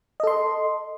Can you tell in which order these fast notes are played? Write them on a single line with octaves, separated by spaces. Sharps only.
D#5 A4 C6